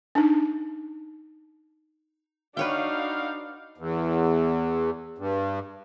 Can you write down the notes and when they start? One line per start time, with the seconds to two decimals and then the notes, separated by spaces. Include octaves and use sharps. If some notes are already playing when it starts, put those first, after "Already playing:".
0.15 D4 D#4
2.57 D4 D#4 F#4 B4 C#5 F5 G5
3.78 E2
5.18 G2